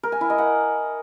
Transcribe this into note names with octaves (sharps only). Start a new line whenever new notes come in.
A#4
G#5
E4
D#5
F#5